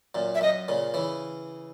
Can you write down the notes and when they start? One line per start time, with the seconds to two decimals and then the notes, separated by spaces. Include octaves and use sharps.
0.15 F#2 A#2
0.35 E5
0.41 F#2 D#5
0.68 A#2 C#3
0.94 C#3 E3